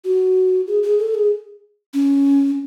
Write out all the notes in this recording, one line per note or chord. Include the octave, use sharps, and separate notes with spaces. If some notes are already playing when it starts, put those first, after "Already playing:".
F#4
G#4
G#4
A4
G#4
C#4